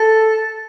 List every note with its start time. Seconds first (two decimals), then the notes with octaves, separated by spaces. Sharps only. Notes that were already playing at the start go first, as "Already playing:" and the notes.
Already playing: A4